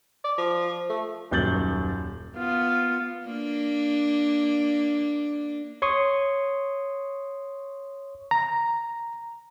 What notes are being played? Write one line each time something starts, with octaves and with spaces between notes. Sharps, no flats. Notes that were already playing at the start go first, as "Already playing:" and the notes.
D5
F3
A3
D#1 F#2 G6 A6 F#7
B3 F4
A#3 D4
C#5 C6 C#6 D#6
A#5